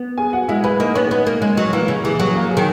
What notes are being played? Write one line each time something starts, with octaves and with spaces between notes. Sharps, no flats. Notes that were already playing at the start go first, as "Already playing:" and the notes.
Already playing: B3
G#4 G#5
F#4 F#5
G#3 E4 E5
G#3 B4 B5
A#3 D#4 D#5
B3 C#4 C#5
B3
A#3
G#3
F#3
E3 A#3 A#4
C#3
E3 G#4
F#3 G#4
A#3 A#4
G#4
D#3